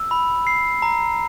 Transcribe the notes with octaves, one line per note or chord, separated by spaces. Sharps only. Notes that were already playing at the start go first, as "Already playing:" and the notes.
Already playing: E6
B5
C7
A#5